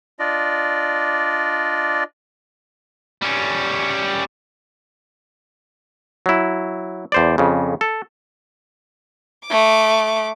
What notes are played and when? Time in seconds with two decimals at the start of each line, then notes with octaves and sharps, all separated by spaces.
0.19 D4 F4 D5 D#5
3.22 G3 C#4
6.26 F#3 E4
7.12 E2 C5 D5
7.38 F2 C#3
7.81 A4
9.47 A3 D6